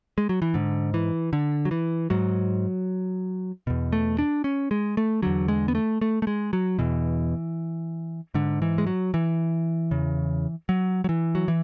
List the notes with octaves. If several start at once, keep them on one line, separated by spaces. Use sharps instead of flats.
G#3
F#3
E3
G#2 D3
E3
D3
F#3
E3
G#2 F#3
E2 B2
A3
D4
C#4
G#3
A3
E2 D3 F#3
G#3
B3
A3
A3
A3
G#3
F#3
E2 B2 E3
G#2 D3
E3
G#3
F#3
E3
E2 C#3
F#3
F#3
E3
F#3
E3